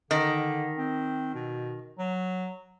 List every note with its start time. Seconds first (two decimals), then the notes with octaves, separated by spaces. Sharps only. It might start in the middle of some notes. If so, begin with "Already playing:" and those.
0.11 D3 D#3
0.78 C4
1.34 B2
1.99 F#3